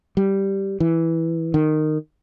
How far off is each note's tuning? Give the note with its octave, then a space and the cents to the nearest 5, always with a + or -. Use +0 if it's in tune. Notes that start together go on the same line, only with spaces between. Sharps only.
G3 -5
E3 -5
D#3 -15